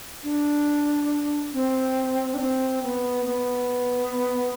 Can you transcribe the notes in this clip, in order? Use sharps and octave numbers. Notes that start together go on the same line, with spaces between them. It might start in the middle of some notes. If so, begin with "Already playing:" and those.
D4
C4
D4
C4
B3
B3